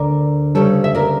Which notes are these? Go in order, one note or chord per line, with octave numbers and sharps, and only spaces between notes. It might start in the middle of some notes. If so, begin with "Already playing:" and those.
Already playing: D2 D3 A#4 D5
D2 C#3 G3 A4 C#5
E5
A#4 D5